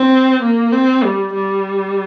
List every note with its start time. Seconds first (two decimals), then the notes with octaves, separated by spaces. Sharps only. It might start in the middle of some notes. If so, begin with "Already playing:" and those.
Already playing: C4
0.43 A#3
0.72 C4
1.04 G3
1.34 G3